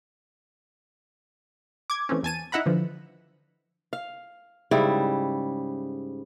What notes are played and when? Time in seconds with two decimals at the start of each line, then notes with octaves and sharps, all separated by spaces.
1.90 D6 G#6
2.09 E3 A3 C4 C#4
2.23 E2 G#5 A5 D#7
2.52 D#4 E4 E5 F#5 A#5 B5
2.66 D3 E3 F3
3.93 F5
4.71 G#2 C#3 G3 E4